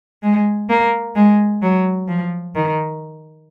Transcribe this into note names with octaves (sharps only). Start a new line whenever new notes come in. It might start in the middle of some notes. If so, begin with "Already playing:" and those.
G#3
A#3
G#3
F#3
F3
D#3